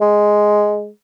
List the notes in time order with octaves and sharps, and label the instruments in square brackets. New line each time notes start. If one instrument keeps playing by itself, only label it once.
[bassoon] G#3